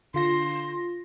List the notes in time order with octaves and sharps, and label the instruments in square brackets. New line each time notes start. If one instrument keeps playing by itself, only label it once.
[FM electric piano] D3 F4 A#6 [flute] C6